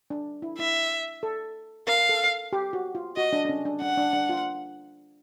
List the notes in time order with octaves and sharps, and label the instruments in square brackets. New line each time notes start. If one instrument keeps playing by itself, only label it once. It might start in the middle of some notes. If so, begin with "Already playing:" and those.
[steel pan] D4
E4
[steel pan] E4 [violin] E5
[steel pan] A4
[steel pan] A#4 [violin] F5
[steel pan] A4
G4
F#4
F4
[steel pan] F#4 [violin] D#5
[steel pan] D4
D4
C#4
D4
[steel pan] D4 [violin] F#5
[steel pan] D4
D4
F4